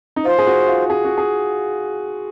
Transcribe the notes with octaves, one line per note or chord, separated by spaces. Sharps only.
D#4
F4 C5
G#4
F#4
F4
G#4
F#4
G#4